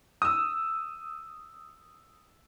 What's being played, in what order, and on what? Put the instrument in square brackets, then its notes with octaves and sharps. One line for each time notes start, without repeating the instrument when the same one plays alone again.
[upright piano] D#6 E6